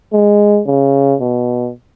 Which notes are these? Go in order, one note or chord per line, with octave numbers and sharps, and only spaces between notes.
G#3
C#3
B2